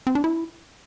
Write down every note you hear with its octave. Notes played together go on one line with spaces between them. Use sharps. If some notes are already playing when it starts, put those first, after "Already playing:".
C4
D4
E4